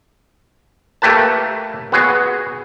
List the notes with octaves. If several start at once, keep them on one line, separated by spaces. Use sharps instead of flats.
A3 A#3 G4 B4 A5
B3 F#4 G#4